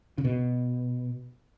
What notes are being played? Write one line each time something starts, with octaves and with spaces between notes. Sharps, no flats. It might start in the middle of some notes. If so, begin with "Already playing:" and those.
C#3
B2